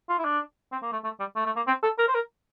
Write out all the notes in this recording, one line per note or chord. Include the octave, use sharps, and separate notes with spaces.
F4
E4
D4
C4
A#3
A3
A3
G3
A3
A3
A#3
C4
A4
A#4
C5
A#4